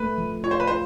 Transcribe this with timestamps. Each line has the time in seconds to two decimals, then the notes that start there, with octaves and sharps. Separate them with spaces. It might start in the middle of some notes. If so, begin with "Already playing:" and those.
Already playing: A3 B4
0.18 F3
0.44 F4 C#5
0.51 C5
0.60 B4
0.67 F4 C5